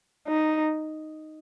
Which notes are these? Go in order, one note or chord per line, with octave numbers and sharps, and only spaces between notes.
D#4